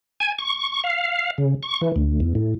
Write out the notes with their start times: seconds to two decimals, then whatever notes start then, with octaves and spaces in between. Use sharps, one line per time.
0.20 G#5
0.39 C#6
0.84 F5
1.38 C#3
1.63 C#6
1.81 E3
1.96 D2
2.20 E2
2.35 A2